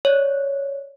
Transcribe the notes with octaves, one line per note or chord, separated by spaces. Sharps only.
C#5 D5